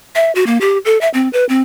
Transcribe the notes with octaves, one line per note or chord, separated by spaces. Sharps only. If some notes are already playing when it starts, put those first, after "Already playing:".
E5
F#4
A#3
G4
A4
E5
C4
B4
C4